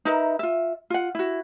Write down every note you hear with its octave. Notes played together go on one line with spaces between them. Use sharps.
D#4 A#4 B4 E5
F4 E5
F4 F#5
E4 F#4